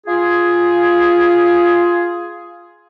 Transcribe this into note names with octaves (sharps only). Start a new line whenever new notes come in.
F4 G#4